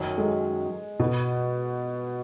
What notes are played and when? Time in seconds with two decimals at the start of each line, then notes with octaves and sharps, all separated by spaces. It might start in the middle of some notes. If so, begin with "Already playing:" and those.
Already playing: F#2 D#3 F#3
0.18 G#3
1.00 B2